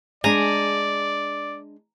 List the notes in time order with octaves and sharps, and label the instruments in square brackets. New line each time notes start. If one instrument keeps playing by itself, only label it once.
[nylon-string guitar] G#3 D4 [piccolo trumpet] D5 [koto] G#5 A#5